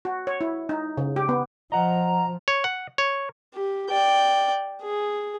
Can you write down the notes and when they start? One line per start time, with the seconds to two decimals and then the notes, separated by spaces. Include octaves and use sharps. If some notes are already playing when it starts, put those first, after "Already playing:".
0.05 F#4
0.27 C#5
0.41 E4
0.69 D#4
0.97 C#3
1.16 G4
1.29 B3
1.72 F3 D#5 F#5 A#5
2.48 C#5
2.64 F#5
2.98 C#5
3.54 G4
3.90 D5 G5
4.82 G#4